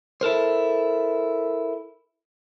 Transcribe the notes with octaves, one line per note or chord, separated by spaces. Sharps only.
E4 A4 A#4 C5